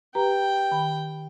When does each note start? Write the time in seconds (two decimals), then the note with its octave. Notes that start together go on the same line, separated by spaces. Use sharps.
0.15 G4 B4 G5 A#5
0.71 D#3 B5